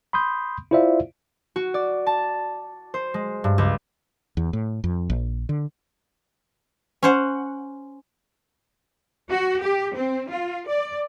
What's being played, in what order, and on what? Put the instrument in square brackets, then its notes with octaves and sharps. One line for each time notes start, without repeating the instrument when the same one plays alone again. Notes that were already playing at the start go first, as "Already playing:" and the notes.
[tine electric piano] B5 C6 D#6 G6
E4 F4 C5 D5 E5 F5
[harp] F#4
D5
A5
C5
G#3
G2
C#2
[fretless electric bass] E2
A2
F2
A#1
D3
[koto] C#4 C5 F#5
[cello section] F#4
G4
C4
F4
D5